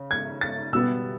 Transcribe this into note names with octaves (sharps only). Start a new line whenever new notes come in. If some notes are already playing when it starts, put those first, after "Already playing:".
Already playing: C#3
G#6
A6
B2 G3 B3 E6